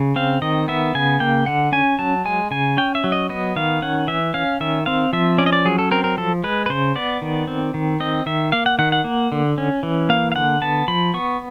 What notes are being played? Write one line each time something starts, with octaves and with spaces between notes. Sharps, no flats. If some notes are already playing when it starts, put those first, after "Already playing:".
Already playing: C#3
C4 F5
D#3 D#5
B3 E5
C#3 G#5
A#3 G5
D3 F#5
C#4 G#5
F#3 A5
G#3 G#5
C#3 G#5
C#4 G5
E5
F#3
D#5
B3 D#5
D#3 F5
C#4 F#5
E3 E5
C#4 F5
D#3 E5
C4 F5
F3 E5
C#4 D5
D#5
D5
F#3 G#4
A4
C4 A#4
A#4
F3 A4
G#3 B4
B4
C#3 C5
B3 D5
D#3
C4
D#3
C4 D#5
D#3 E5
A#3 F5
F#5
D#3 F#5
F#5
A#3
D3
C#4
E3
A#3 F5
F5
D3 F#5
B3 A5
F3 B5
B3 C#6